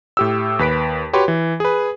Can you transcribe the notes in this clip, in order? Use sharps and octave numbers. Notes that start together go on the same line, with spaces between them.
A2 G4 E6
D#2 B4 B6 D7
F#4 G4 B4 C#5 C6
E3
G#4 B4